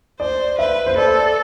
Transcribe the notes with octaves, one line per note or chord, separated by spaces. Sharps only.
C5 D5
B4 E5
C5
A4 D5